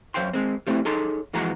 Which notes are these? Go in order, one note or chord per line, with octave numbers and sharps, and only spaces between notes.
F#2 G#3 C5 F5 G5 C6
G#3 C4
G3 A3 C4 E4
D#4 G#4 A4 C#5 C6
F2 E3 G#3 F#4 A#5